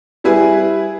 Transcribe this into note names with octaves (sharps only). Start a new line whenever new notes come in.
G3 E4 G#4 B4